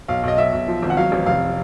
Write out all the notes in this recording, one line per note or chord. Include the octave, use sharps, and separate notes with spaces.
B1 F5
B1 D#5
B1 E5
B1
F3
G#1
F#5
F#3 F5
A1
F1 F5